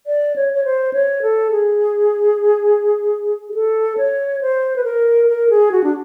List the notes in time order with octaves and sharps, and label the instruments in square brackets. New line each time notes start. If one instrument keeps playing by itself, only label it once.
[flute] D5
C#5
C#5
C5
C#5
A4
G#4
G#4
A4
C#5
C5
B4
A#4
A#4
G#4
F#4
D4